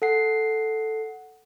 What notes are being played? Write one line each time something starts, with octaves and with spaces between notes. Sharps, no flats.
A4 F#5 C7